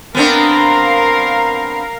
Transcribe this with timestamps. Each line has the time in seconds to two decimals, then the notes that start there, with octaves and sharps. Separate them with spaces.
0.15 B3 C4 D4 A#4 F5